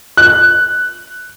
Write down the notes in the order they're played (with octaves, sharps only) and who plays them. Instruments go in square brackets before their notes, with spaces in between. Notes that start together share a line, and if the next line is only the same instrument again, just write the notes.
[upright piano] F#6